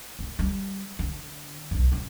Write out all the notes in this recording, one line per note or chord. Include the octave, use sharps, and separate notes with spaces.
A#3
G3
D3
B1 E2
D2 C#3